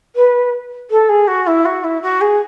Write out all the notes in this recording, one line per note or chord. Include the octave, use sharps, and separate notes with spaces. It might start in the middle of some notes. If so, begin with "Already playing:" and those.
B4
A4
G#4
F#4
E4
F#4
E4
F#4
G#4